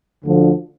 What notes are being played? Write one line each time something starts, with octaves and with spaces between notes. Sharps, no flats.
D2 D3 F3